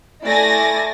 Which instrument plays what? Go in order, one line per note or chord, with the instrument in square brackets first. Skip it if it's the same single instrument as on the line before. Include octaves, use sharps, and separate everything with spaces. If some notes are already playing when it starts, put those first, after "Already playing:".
[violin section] A3 E4 D5 G#5 A6 A#6